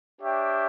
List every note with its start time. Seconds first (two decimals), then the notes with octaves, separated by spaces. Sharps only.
0.21 D4 G4 C#5 E5 G5